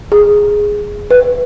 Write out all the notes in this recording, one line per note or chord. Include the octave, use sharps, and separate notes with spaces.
G#4
B4